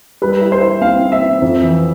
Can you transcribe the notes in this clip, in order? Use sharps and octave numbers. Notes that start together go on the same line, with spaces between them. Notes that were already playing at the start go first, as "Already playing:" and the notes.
G3 B4
E4
C5
E4
C4 F5
C4
E5
C4
F2
E3